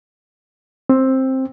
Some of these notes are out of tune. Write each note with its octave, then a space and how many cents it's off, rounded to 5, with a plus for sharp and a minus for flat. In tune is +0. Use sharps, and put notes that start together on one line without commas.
C4 +10